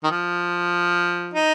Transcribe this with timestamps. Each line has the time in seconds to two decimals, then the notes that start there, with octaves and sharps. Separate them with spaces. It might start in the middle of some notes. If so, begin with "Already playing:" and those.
0.04 D#3
0.11 F3
1.34 D#4